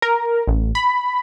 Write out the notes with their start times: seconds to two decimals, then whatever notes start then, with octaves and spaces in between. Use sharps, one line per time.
0.02 A#4
0.48 A1
0.75 B5